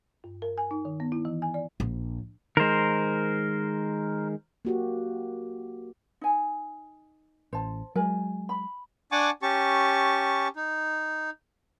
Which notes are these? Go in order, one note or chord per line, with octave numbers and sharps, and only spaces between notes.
G2
A#4
G#5
D#4
D#3
B3
E4
E3
G#5
D5
A#1
D#3 G#3 A#4 C5
A#3 F#4 G4
D#4 G#5
A1 C5 A5
F#3 G#3 A#4 G#5
B5
D4 F#5 G#5 A5 C#6 D6
C#4 G4 A5 C#6
D#4